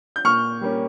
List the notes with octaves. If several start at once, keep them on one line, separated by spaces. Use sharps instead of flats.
G6
A#2 C#6 F6
G3 A#3 C#4